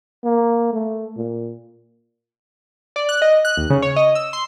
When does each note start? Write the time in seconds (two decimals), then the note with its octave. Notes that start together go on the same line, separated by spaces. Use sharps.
0.24 A#3
0.73 A3
1.17 A#2
2.96 D5
3.09 F#6
3.22 D#5
3.45 F#6
3.57 D#2
3.70 C#3
3.82 C#5
3.96 D#5
4.15 E6
4.33 C6